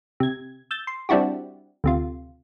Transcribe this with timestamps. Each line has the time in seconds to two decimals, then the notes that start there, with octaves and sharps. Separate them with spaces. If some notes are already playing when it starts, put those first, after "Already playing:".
0.20 C3 G#6
0.71 E6 G6 A6
0.87 C6
1.09 G3 C4 D4 E4 F#4 G4
1.84 D2 C3 F4